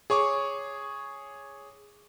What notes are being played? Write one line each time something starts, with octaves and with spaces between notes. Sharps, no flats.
G#4 C#5 C#6 D6